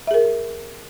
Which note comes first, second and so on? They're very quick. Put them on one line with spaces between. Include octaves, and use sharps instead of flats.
E5 G#4 A#4